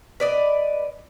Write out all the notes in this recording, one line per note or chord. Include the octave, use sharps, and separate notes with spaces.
B4 D5 D#5